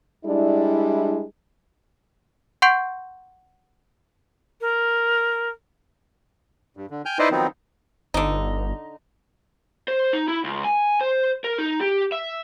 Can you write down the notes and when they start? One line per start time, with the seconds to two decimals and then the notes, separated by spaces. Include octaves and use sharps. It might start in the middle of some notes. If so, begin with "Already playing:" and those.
0.25 G3 G#3 D4 E4
2.62 F#5 C6 C#6 G6 C7 D7
4.61 A#4
6.77 G2
6.90 D3
7.05 G5 G#5 F6 G6
7.19 D#4 E4 B4 C5 D5 D#5
7.31 D#3 F3 F#3 B3 C4 D#4
8.14 G1 D3 D#4
9.88 C5
10.13 D#4
10.28 E4
10.44 C#2
10.64 G#5
11.01 C5
11.44 A#4
11.58 D#4
11.81 G4
12.12 E5